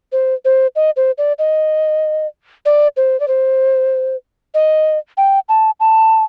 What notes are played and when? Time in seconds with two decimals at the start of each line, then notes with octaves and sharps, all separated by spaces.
0.12 C5
0.45 C5
0.76 D#5
0.97 C5
1.18 D5
1.39 D#5
2.66 D5
2.97 C5
3.20 D5
3.28 C5
4.54 D#5
5.17 G5
5.49 A5
5.80 A5